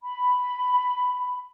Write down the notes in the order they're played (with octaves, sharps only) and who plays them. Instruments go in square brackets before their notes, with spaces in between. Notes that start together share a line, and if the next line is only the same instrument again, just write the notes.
[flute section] B5